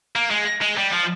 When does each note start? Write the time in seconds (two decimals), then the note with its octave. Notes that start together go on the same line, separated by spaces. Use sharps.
0.16 A#3
0.30 G#3
0.61 G#3
0.78 G3
0.92 F3